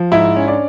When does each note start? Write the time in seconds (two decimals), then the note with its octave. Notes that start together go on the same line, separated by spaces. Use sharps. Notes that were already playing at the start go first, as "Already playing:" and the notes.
Already playing: F3
0.12 G#2 E4 E5
0.36 C#4
0.47 D4 D5